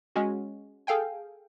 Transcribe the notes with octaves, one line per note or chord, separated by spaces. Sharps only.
G#3 C#4 F#4
G#4 A4 F5 G5 G#5